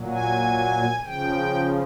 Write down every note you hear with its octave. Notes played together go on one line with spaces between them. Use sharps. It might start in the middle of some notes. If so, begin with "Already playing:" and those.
Already playing: A#2 F#3
G#5
C#3 F3 G5